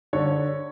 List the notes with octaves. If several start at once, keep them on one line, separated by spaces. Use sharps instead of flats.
D3 C#5